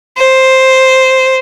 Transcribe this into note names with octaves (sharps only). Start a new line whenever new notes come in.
C5